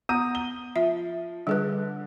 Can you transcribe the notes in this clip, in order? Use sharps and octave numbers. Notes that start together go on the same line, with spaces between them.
B3 A#5 D#6 D#7
G7
F3 E5
D3 G3 G#4 B4